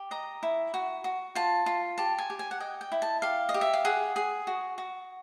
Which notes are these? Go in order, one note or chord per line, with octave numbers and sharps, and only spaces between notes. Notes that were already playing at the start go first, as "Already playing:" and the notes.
Already playing: G4
D#5 A#5
E4
F#4
F#4
F4 A5
F4
G4 A5
G#5
G4
G#5
F#5
D#5 G5
G5
E4
A5
G4 F5
D#5
G4
E5
F5
G#4 F#5
G#4
F#4
F#4